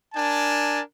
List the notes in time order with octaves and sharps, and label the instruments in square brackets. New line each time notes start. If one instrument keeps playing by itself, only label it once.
[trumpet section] D4 A#4 G#5 A5